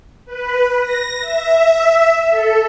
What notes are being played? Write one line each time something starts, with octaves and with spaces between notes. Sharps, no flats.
B4
A#6
E5
A4